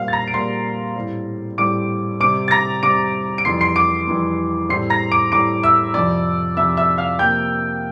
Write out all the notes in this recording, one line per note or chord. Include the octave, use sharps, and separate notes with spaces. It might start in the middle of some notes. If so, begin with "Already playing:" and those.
Already playing: A#2 G3 C4 F5 F6
A6
A#5 A#6
D7
A#2 G3 C4 C6 C7
A2 G3 C4
A2 G3 C4 D6 D7
C3 G3 C4 D6 D7
A6
A#5 A#6
C3 G3 C4 D6 D7
D7
F2 E3 G3 C6 C7
C6 C7
D6 D7
F2 E3 G3
A2 G3 C4 C6 C7
A#5 A#6
D6 D7
A2 G3 C4 D6 D7
E5 E6
F2 C3 F3 C4 D5 D6
F2 C3 F3 C4 E5 E6
E5 E6
F5 F6
C3 F3 A#3 G5 G6